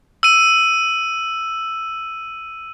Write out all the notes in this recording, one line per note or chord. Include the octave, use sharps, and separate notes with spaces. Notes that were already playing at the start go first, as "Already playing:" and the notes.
E6 D#7